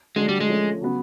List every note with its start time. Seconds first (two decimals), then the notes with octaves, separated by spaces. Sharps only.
0.16 D3 F#3 G#3 A3 D4
0.29 G3
0.40 G#3
0.48 F3 A3 C#4
0.81 C#3 F#3 B3